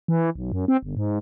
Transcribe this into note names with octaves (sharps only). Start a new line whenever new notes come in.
E3
B1
F#2
C4
G1
G#2